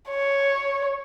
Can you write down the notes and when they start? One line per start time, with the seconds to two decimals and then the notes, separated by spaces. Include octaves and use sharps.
0.10 C#5